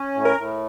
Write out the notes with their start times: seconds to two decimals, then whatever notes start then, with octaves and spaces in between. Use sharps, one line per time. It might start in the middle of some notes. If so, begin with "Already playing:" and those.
Already playing: C#4
0.14 A2
0.25 A#4
0.37 A2